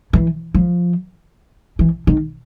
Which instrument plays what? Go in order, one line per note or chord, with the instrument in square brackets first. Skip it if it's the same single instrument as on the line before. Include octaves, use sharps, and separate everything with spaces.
[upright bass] E3
F3
E3
D#3